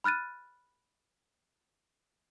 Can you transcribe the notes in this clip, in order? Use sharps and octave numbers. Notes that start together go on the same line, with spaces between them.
B5 F6 F#6 A6 D#7